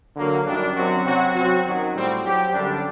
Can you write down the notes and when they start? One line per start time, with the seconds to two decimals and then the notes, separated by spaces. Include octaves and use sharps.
0.16 D3 F#3 A#3 F#4
0.46 F#2 D#3 G3 D4
0.75 F#2 F#3 C4 F#4
1.05 C3 F#3 C4 F#4
1.35 F#3 C4 F#4
1.65 F#2 D#3 F#3
1.94 A2 G3 C4
2.23 F#3 C4 G4
2.53 F#2 D3 G3 D4